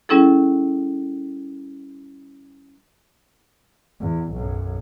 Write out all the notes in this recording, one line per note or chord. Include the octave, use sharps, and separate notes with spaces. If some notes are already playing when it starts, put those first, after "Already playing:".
G3 C#4 E4 G#4 A4
E2
B1 F#2